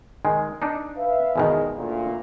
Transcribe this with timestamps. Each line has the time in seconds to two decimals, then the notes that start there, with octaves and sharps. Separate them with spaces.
0.25 D#3 G#3
0.62 D4 D#4
0.96 B4 E5 F5
1.36 E2 B2 D#3 G#3
1.75 D2 A#2